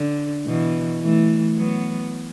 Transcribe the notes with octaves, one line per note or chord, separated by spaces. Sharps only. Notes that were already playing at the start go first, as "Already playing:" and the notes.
Already playing: D3
B2 E3
E3 A3
F#3 B3